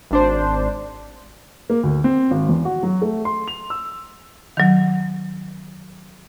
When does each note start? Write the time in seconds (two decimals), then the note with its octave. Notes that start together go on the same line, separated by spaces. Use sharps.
0.11 G#1 D4 C5
1.70 A#3
1.83 D2
2.04 C4
2.31 G#1
2.49 E2
2.65 F#4
2.83 F#3
3.02 A3
3.25 C6
3.48 F7
3.70 E6
4.57 D#3 F#3